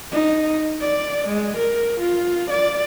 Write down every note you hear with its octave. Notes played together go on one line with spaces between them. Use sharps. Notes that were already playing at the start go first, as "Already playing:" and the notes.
D#4
D5
G#3
A#4
F4
D5